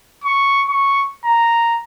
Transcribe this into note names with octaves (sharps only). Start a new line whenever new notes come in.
C#6
C#6
A#5